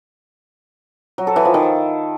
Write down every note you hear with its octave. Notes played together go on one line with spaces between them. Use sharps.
F#3
A4
E3
F3
D#3